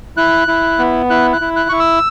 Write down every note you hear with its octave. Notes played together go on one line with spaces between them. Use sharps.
E4 F#6
E4
B3
E4 F#6
F#6
E4
F#6
E4 C#6
E6